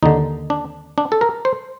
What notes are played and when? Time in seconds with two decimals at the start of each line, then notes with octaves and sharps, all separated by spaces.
0.03 D#2 D3 D#4
0.50 D4
0.98 D4
1.12 A4
1.21 A#4
1.45 C5